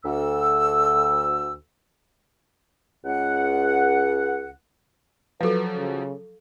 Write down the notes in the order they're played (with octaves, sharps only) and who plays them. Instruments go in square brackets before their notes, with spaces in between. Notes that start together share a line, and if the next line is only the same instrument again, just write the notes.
[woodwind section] D2 E6
C#2 F#5
[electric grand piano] F3 F#3 [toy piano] A4 F5 [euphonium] B4
[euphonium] C#3